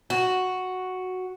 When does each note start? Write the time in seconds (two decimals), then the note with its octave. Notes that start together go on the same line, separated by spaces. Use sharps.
0.10 F#4